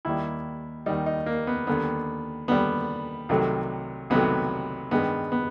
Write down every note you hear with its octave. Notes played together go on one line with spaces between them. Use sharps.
D#2 D#3 G3 E4
D#2 D#3 G3 D#4
D#4
A#3
B3
D#2 D3 G3 B3
D#2 D3 G3 B3
C2 C3 D#3 F#3 A3
C2 C3 D#3 F#3 A3 B3
G2 D#3 G#3 B3
B3